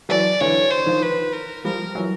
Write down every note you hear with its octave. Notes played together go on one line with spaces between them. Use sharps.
E3 F#3 D5
D3 E3 C#5
C5
D#3 F3
B4
A#4
F3 G3 A#4
E3 F#3